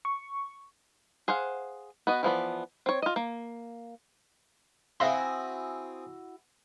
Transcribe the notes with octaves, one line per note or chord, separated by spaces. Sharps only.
C#6
G#4 C5 F5 F#5
B3 F#4 D#5
E3 F3 B3 D5
C4 C#5
F4 D#5
A#3
C4 E4 F#4 G#4 E5 F5 C6